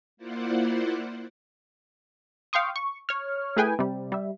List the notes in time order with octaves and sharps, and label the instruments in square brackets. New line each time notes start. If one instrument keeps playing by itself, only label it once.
[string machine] A#3 E4 F4 C5 D5 F#5
[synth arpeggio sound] F5 G5 C6 C#6 D#6
C#6
C#5 F6
A3 E4 G#4 B4 G5 G#5
C3 G3
G3 E5